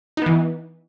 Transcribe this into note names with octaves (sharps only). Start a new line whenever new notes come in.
E3 B3 D#4